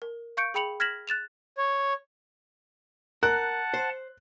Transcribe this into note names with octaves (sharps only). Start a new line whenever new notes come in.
A#4
F5 C#6 G6 C#7 D7
G#4 G5 B5 C#7 F7 F#7
F6 G#6 A#6 B6 E7 F#7
F#6 A6 E7 F7
C#5
A#4 F#5 A5 F#6
C5